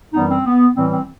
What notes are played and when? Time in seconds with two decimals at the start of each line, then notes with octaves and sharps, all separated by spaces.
0.13 F#2 E3 G3 B3 D#4
0.29 C4
0.45 B3
0.75 A2 E3 G3 C4
0.91 C4